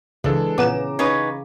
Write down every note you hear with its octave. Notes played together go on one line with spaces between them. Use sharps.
C#2 E3 G#3 D4 A4
A#1 C#3 B3 A#5 D6 E7
C#4 D#4 B4 F5